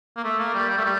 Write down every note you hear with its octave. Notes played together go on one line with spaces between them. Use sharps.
A#3
A3
A#3
G3
G3
A3
G3